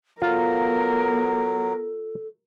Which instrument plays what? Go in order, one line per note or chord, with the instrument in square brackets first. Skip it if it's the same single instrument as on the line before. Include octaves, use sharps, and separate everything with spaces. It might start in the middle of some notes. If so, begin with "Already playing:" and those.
[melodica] F#3 [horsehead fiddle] B3 A#4 [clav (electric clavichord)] F4 [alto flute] A4